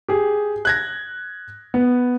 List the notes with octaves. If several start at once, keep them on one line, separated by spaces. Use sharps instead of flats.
G4 G#4
F#6 G#6 A#6
B3